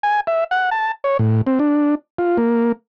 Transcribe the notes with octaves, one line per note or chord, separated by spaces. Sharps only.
G#5
E5
F#5
A5
C#5
A2
C4
D4
F4
A#3